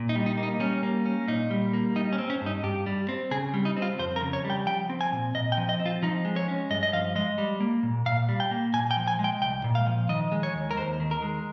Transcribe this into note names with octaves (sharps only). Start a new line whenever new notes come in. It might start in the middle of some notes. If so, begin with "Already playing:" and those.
Already playing: A#2
D#4
G3
D#4
A#3
D#4
G3 C#4
A#3
C#4
A#2 D#4
G3
A#3
G3 D#4
C#4
C4
C#4
G2 D#4
G2 G4
G3
C4
C#3 G#4
G3
D#4
C4
F4
F2 C5
A#4
C#3
C#5
G3
G5
F3 G5
C4
G#5
A#2
A#2 D#5
G5
F3
D#5
C4
F4
F3 D#4
G#3
C#5
C#4
G2 D#5
D#5
F3 F5
G#3 D#5
G3
A#3
A#2
A#2 F5
G3
G5
A#3
A#2 G#5
G5
F3
G#5
G#3
G5
C2 G5
A#2
F5
F3
D#3 D#5
G#3
C#5
D#2
A#4
D#2 C5
D#3
A#4
G#3